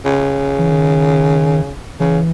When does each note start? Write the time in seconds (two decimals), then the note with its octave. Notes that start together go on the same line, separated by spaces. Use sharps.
0.05 C#3
0.59 E3
0.70 D#3
2.00 C#3 E3